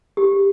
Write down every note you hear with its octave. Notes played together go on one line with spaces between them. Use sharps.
G4